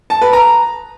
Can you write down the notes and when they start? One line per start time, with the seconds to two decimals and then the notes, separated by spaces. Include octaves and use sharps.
0.10 A5
0.22 B4
0.33 A#5